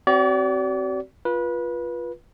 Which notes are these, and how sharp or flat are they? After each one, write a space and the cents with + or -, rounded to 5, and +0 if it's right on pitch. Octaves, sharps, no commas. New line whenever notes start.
C4 +0 F#4 +40 D5 -35
F4 +0 B4 -25